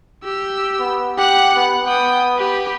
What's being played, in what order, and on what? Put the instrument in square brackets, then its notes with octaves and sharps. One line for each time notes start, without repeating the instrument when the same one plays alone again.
[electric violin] G4 E6
[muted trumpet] B3
[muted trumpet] G4 [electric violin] F#5 F#6
[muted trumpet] B3
[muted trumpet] B3 [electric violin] G5 D#6
[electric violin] G4 B4